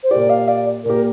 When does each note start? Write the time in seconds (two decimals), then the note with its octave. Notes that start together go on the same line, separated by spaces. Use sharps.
0.04 C5
0.11 A#2 A#3 G4 D5
0.30 F5
0.48 D5
0.85 A#2 A#3 G4 A#4